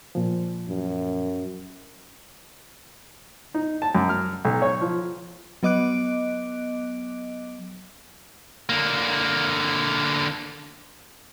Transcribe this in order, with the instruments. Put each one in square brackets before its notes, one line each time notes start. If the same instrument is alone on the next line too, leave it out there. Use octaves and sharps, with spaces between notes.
[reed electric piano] A#2 F3
[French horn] F#2
[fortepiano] D#4
A5
F#2
F6
B1
C#5
F3
[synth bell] F#3 B3 D#5 D6 F#6 D7
[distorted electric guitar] D3 A#3